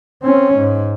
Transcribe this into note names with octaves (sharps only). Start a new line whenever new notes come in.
C4 C#4
G#2